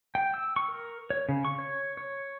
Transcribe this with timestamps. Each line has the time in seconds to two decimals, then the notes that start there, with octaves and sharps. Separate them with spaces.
0.15 G5
0.34 E6
0.56 C#6
0.68 A#4
1.10 C#5
1.29 C#3
1.45 C#6
1.59 C#5
1.97 C#5